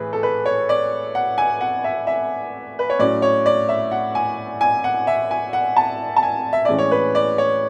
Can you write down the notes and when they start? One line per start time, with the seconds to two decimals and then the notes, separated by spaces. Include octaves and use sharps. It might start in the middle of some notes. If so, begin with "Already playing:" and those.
Already playing: A2 E3 A3 G#4 B4
0.13 A4
0.23 B4
0.46 C#5
0.69 D5
1.15 F#5
1.38 G#5
1.61 F#5
1.84 E5
2.07 E5
2.79 B4
2.90 C#5
2.99 A2 F#3 C#4 D5
3.22 C#5
3.46 D5
3.69 E5
3.92 F#5
4.15 G#5
4.61 G#5
4.84 F#5
5.07 E5
5.31 G#5
5.53 F#5
5.77 A5
6.16 A5
6.23 G#5
6.53 E5
6.65 A2 E3 G#3 C#4 D5
6.78 C#5
6.91 B4
7.15 D5
7.38 C#5